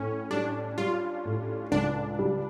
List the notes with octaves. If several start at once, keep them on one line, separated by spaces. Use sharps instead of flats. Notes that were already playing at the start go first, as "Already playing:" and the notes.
Already playing: A2 C#4
G3 D4
G3 F4
A2
C#2 D4
G3